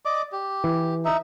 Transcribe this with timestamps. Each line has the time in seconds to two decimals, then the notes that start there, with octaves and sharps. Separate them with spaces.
0.05 D5 D#5 D6
0.32 G4
0.64 E3
1.05 D#4 E5